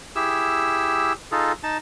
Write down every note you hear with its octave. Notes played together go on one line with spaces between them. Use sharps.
E4 G4 G#4 E6
D#4 F4 G#4 A4
D#4 A5